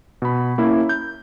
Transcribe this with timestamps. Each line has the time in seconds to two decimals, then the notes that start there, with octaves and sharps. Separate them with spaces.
0.22 B2 B5
0.58 A#3 C#4 E4
0.89 G6